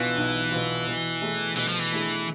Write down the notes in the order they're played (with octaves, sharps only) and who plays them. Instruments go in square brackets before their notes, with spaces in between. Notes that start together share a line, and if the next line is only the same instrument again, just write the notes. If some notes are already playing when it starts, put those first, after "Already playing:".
Already playing: [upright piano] B1 B2 B3 F4 [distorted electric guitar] E3
[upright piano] B1
B2 B3 F4
B2
A3 E4 G#4
[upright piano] B2 [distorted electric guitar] E3
[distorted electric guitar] F3
E3
[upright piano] A3 E4 G#4